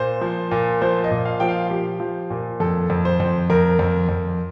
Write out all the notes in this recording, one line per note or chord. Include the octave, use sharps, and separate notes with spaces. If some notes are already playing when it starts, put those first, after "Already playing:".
Already playing: A#2 C5
F3
A#2
F3 C5
D#5
A#2
F5
F3 G5
F5
F3 G4
F3
A#2
F2 A4
F2
C5
F2
F2 A#4
F2
F2